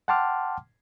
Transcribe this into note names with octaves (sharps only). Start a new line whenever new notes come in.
F#5 G5 A5 C6 D6 F6